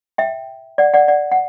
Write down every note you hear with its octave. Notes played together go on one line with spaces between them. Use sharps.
E5 G5
D5 F#5
D5 F#5
D5 F#5
F#5